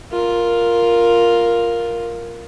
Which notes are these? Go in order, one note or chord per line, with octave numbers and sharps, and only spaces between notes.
F4 A#4